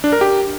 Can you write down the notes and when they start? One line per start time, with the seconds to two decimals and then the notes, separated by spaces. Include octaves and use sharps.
0.04 D4
0.12 A#4
0.21 G4